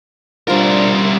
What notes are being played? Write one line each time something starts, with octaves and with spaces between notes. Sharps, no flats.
G3 D4 F4 A#4 C5